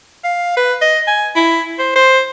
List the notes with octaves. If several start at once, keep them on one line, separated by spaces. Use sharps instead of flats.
F5
B4
D#5
G#5
E4
C5
C5